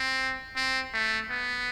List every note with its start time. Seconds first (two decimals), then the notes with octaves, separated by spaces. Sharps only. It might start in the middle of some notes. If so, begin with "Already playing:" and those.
Already playing: C4
0.56 C4
0.94 A3
1.30 B3